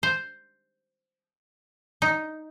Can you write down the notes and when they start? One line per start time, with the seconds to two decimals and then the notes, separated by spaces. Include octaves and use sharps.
0.03 C5
2.02 D#4